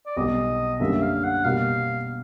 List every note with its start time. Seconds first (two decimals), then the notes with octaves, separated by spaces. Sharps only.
0.06 D5
0.16 B1 B2 G3 D#5
0.80 F#2 D3 G3 A#3 E5
1.02 F5
1.24 F#5
1.44 B2 G3 A#3 F5